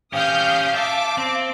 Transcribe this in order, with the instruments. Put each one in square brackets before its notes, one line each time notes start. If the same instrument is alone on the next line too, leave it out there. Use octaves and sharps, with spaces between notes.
[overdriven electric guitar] C#4 G4 [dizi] F5 [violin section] D#6 F6 G6
[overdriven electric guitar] E5 [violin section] A5 D6
[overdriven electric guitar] C4